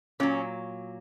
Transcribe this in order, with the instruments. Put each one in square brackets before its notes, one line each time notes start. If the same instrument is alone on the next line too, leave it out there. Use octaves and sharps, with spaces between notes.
[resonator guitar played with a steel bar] A#2 F#3 C#4